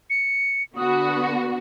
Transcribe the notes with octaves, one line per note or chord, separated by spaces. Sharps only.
C#7
D3 B3 F#4 D#6